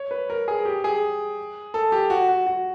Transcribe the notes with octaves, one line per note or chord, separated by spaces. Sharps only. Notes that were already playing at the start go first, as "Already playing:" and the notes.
Already playing: C#5
B4
A#4
G#4
G4
G#4
A4
G4
F#4
F#4
F#4